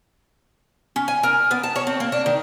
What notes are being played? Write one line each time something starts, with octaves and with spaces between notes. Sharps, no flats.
C#4
G#5
A#4
B3
A5
C#5
C4
A#3
D4
D#3